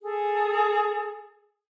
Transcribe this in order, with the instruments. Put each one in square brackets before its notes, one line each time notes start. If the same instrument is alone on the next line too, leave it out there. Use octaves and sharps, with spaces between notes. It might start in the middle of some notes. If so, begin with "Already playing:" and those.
[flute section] G#4 A4